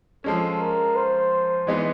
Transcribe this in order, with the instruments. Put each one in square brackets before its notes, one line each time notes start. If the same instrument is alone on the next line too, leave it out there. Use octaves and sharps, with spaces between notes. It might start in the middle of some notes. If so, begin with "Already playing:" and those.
[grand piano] F3 G#3 C#4 [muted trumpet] A4
[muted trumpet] A#4
C5
[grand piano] E3 G#3 B3 D#4